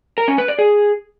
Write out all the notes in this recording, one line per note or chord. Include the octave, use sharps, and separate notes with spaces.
A#4
C#4
B4
D5
G#4